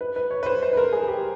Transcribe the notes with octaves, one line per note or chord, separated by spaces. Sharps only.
B4
B4
C#5
B4
C5
C5
B4
A#4
G#4
G4